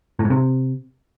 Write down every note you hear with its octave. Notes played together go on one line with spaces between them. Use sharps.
A2
G#2
C3